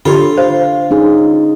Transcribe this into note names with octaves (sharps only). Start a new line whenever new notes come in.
D3 F4 G4 A4 C#5 B5 C6
C5 F5
C#4 D#4 G#4